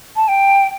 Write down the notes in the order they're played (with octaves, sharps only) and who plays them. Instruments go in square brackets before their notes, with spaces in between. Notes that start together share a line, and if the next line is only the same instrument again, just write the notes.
[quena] A5
G5